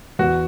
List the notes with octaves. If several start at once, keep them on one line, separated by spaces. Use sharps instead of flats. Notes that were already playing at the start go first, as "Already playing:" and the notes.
E2 F#4